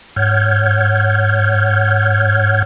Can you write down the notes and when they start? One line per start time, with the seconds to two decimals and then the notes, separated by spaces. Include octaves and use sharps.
0.16 G#2 C#5 F#5 F6 G6 G#6